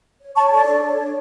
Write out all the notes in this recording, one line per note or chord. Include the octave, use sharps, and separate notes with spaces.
C#5
C#5 A5 C#6
A4 D5
D4
C#5
D4